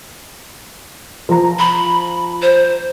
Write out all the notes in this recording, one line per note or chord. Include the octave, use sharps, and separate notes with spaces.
F3 A#5
B5
C5